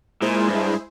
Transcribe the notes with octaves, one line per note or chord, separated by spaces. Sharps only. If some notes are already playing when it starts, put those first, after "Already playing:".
A#2 G#3 E4 G#4 C5
G2